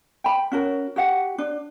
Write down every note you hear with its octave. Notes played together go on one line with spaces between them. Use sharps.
G5 B5
C#4 F#4 A#4
F#4 G4 F#5
D4